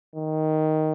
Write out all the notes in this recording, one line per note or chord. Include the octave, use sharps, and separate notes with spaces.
D#3